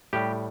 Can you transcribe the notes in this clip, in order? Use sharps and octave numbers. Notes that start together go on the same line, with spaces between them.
A2 G3 G4